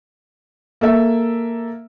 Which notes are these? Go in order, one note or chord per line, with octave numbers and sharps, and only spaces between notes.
A#3 A4 E5